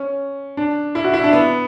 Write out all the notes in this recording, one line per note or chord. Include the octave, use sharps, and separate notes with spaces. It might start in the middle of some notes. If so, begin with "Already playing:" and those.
Already playing: C#4
D4
E4
F#4
E4
D4
B3